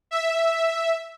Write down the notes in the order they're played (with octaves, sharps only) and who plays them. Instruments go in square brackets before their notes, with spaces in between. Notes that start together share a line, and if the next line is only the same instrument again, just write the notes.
[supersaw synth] E5